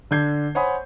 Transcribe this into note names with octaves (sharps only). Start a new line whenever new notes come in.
D3 D4 G6 G#6 C7
C5 C#5 F#5 G#5 B5 D#6